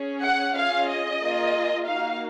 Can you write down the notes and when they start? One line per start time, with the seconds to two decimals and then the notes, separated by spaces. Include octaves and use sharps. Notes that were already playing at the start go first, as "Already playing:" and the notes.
Already playing: C#4 G#4
0.21 F#5
0.54 C#4 F4 G#4 F5
0.88 D#5
1.20 A#3 F4 G#4
1.85 A#3 D#4 F#4 F5